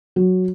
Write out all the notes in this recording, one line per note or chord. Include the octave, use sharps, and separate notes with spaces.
F#3